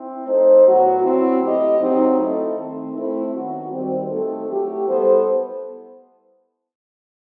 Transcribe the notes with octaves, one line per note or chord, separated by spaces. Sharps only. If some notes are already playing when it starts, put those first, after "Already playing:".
Already playing: C4 E4
A3 D#4 A4 C5
A2 F#3 B3 F#4
F#3 C4 E4
A3 E4 G4 D#5
F#3 C4 D#4
A3 E4 A4 D#5
D#3 A3 C4 D#4
A3 C4 E4
D#3 F#3 B3 F#4
D#3 G3 C4
A3 C4 D#4 F#4 A4
F#3 A3 E4 G4
G3 B3 E4 A4 C5